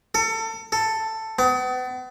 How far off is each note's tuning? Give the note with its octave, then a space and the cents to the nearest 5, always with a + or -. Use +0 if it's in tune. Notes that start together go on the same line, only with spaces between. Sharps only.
A4 +30
A4 +10
B3 +40